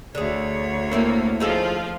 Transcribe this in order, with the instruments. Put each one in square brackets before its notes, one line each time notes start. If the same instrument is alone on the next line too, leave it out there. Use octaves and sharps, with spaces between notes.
[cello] D2 C#5 [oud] D3 G#4
[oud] A3 C4 E4 [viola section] A#3
[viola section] F3 F4 [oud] D#4 G#4 A4